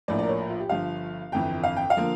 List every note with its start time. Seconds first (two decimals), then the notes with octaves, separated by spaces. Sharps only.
0.08 A#1 A2 F3 A#3 D5
0.19 A#4 D5
0.29 C#5
0.39 A#4
0.50 F4
0.60 G4
0.69 G1 G2 F3 F5
1.32 G1 F2 E3 G5
1.64 F5
1.77 G5
1.90 F5
1.97 D3 F3 A#3